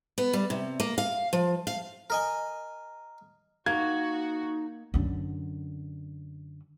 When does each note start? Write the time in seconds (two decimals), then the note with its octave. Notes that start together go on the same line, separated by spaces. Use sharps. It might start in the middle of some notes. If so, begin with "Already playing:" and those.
0.18 B3
0.33 G3
0.50 C3
0.80 A#3
0.98 F5
1.33 F3
1.67 F5
2.10 A#4 D#5 G#5
3.66 A#3 D#4 F#4 G#6
4.94 F#2 D3